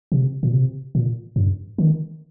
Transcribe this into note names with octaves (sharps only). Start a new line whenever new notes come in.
C3
A#2
C3
A#2
G2
D#3